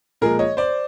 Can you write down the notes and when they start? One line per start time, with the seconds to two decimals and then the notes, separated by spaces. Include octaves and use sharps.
0.21 A#2 F3 G#3 G#4 A#4
0.39 C#5 D#5
0.57 C5 D5